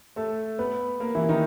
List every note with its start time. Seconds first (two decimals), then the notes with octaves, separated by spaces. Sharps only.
0.16 A3 A4
0.59 B3 B4
1.00 A#3 A#4
1.15 E3 E4
1.29 D#3 D#4